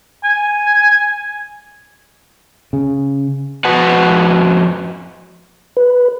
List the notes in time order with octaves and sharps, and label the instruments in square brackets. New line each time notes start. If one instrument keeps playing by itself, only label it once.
[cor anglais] G#5
[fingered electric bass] C#3
[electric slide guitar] F2 F#4 B4 F#5
[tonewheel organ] B4